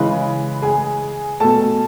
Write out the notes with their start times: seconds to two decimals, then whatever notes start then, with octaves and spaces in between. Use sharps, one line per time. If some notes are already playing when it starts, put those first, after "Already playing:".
Already playing: C#3 E3 G#3 B4 B5
0.62 G#4 G#5
1.40 B2 A3 A4 A5